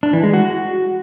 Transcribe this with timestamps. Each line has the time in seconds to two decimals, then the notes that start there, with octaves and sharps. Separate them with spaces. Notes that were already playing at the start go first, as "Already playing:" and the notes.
0.03 D4
0.13 E3
0.23 G#3
0.34 F#4